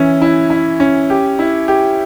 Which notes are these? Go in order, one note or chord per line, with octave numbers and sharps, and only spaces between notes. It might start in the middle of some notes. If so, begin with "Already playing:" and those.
Already playing: E3 C#4 E4
E4
E4
C#4
G4
E4
G4